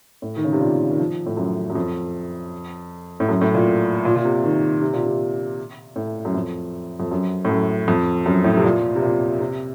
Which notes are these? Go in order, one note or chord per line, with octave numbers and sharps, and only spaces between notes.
A2
D#3
C#3
C3
A#2
D#3
F3
A2
F#2
F#2
F2
A2
F#2
A2
A#2
A#2
A#2
C3
D#3
C3
A#2
C3
A2
F#2
F2
F2
F#2
A2
F#2
F2
F#2
A2
C3
A#2
C3
A#2
C3